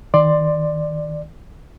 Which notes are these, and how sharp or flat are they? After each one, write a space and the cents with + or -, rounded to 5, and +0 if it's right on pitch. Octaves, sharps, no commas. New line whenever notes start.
D#3 +15 D5 +15 C6 +0